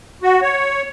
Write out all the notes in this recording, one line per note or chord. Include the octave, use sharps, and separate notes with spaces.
F#4
C#5